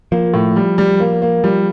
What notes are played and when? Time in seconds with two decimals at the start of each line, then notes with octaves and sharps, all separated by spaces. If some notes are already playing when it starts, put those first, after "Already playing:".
0.12 F3 A#3
0.34 A2
0.56 G3
0.78 G3
1.00 A#3
1.22 A#3
1.44 F3 G3